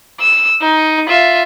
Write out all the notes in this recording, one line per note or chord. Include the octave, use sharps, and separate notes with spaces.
E6
D#4
F4 E5